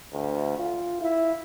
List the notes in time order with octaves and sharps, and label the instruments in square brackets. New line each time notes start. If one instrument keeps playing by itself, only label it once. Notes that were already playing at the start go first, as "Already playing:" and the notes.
[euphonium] D2
F4
E4